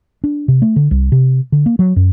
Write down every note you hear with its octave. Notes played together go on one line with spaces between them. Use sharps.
D4
C3
A3
D3
C2
C3
D3
A#3
F#3
F#2